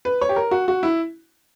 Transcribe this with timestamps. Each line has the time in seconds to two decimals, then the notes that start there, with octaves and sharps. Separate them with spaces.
0.05 B4
0.21 C#5
0.29 G4
0.36 A#4
0.51 F#4
0.68 F#4
0.83 E4